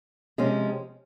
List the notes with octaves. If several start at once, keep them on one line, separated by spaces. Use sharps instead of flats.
C3 F3 G#3 C#4